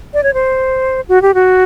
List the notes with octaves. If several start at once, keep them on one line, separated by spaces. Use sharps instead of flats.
D5
C#5
C5
F#4
G4
F#4